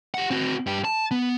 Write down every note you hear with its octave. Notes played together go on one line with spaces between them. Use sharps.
G4 F#5
C4 F#4
G2 G4
A5
B3